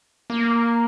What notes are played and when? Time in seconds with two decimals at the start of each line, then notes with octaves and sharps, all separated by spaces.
0.30 A#3